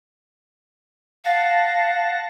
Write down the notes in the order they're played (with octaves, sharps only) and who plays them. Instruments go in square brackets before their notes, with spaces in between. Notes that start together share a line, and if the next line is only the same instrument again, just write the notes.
[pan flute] F5 [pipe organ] F#5 A5 A#6